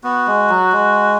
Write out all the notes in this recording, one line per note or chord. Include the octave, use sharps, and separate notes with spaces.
B3 F#4
G#3
F#3
G#3